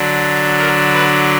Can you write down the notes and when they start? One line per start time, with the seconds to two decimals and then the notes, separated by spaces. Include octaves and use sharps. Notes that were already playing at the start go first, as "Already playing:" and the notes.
Already playing: D3 F#3 D4
0.58 A#4
0.94 B4